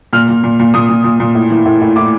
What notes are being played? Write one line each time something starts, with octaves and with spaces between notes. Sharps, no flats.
A#2 F6
A#2
A#2
A#2
A#2 D#6
A#2
A#2
A#2
A2
E3
A2
A2
A2 D6